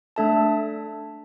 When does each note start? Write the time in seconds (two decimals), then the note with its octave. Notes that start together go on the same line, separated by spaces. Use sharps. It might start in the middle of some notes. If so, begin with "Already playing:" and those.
0.16 A3 D4 A4 E5 A5